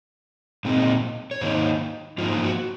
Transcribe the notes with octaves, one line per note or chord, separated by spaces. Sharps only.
A#2 G#3 C4 D#4
C#5
G#2 D#3 A#3 D#4 C5
G#2 F3 A#3 D#4 F4
F4
F#4